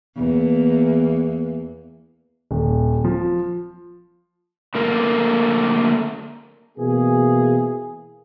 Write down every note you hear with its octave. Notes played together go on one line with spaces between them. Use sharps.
E2 A#3
D#1
F3
D3 A3 A#3 A#4
B2 E3 A#3 G#4